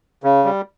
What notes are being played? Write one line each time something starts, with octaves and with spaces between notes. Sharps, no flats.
C#3
G3